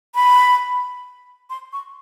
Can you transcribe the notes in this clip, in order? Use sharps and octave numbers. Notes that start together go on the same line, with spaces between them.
B5
C6
C#6